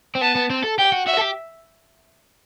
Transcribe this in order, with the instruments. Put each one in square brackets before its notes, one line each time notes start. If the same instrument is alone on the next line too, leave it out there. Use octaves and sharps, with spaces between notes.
[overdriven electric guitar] C4
[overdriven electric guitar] B3 [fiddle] A5
[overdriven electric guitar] B3
C4
A4
[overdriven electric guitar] G4 [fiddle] G5
[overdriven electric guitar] F#4
[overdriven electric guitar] F#4 [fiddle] E5
[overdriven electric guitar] A4
G4